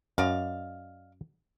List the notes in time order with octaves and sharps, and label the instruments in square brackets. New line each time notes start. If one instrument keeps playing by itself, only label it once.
[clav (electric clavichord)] F#2 [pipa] D5 D#5 F5